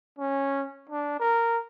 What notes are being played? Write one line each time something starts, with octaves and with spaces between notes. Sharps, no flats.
C#4
D4
A#4